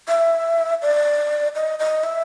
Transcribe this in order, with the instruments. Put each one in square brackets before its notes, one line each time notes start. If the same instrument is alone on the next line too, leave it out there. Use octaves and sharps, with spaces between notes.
[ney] E5
D5
D#5
D#5
E5